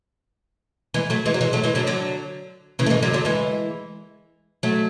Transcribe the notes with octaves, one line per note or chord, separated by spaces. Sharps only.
E3 G#3
F#3 A3
E3 G#3
F#3
E3 G#3
F#3 A3
E3 G#3
D3 F#3
D3 F#3
C#3 E3
A3
E3 G#3
D3 F#3
D3 F#3
E3 G#3
F#3 A3